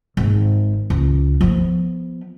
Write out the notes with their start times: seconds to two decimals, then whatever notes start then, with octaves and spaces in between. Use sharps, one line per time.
0.17 G#1
0.90 C#2
1.41 F3 B3